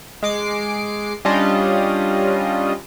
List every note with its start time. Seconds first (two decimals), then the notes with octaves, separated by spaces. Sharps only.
0.23 G#3 D6 C7
1.25 G3 C#4 D4 F4 D#5